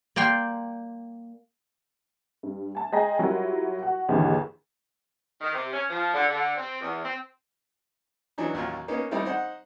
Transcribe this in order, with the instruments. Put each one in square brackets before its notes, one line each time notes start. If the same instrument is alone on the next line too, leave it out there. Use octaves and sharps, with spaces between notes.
[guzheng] A#3 D5 G5 C6
[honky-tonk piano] G2
G#5 A5
G#3 D#5 G5 G#5 A#5 A#6
F#3 G3 E4 F4 A#4
F#4 F#5
D#2 G#2 D3 E3
[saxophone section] D#3
C3
C#4
F3
D3
D3
C4
E2
C4
[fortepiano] E3 F#3 D4 D#4
A1 D#2 F#3 F4
A#3 B3 C#4 D#4
G3 A3 C4 D#4 E4
D#4 C5 F#5